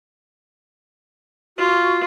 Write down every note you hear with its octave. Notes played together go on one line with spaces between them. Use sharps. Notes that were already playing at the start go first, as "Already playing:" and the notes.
F4 F#4